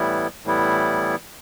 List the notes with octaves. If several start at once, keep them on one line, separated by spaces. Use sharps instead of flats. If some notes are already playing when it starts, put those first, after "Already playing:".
Already playing: A2 E3 G3 B3 E4
A2 E3 G3 B3 E4